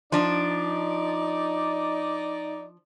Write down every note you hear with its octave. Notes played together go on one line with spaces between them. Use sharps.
F3 D4 D#4 D5